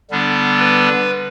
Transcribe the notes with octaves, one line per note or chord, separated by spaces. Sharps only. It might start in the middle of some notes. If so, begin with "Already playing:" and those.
D3 G3 B3 D4
B4